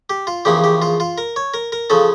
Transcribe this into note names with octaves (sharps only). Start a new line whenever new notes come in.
G4
F4
E2 C#3 F3 A#3 C#4 G4
G4
F4
F4
A#4
C#5
A#4
A#4
C#3 F3 C#4 A4